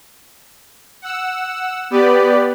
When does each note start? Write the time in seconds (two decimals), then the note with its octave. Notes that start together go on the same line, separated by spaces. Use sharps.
1.02 F#5 E6
1.90 B3 G4 B4 D5